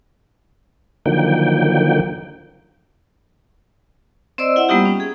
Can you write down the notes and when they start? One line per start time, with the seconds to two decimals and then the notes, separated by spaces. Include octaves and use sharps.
1.06 D3 D#3 F3 F#3 A#3 G5
4.38 C4 C5 D5 D#5 C6 E6
4.56 E4 E5 F#5
4.69 G3 A#3 B3 D#4 F4 G4
4.85 C#4
5.00 G#4